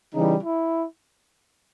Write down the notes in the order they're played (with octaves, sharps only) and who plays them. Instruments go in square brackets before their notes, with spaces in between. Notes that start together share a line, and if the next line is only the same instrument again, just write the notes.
[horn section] C#3 E3 G3 D#4
E4